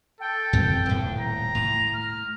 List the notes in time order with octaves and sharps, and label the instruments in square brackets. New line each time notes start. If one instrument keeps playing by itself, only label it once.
[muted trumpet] A4 [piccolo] G5
[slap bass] F#2 C4
D#1 A2
[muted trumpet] A#5
[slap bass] A2 [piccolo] F7
[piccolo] F6